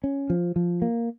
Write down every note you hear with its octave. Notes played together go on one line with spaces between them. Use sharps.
C#4
F3
F3
A#3